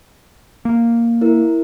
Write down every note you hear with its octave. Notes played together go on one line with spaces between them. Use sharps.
A#3
E4 A#4